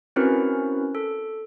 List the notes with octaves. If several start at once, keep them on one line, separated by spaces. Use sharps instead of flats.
C4 C#4 E4 F#4 A#4 B4
A4